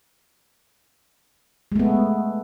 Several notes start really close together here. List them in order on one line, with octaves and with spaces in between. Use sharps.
G#3 A3 B3